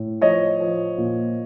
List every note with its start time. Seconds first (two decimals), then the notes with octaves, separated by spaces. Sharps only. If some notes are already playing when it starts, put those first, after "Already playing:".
Already playing: A2
0.22 F3 C#5 D#5
0.60 F3
0.98 A#2